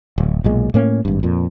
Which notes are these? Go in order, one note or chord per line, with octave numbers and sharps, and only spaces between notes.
D1
B1 A#2 G#3
A2 A#3 C#4
G#1 G2
F2 A#2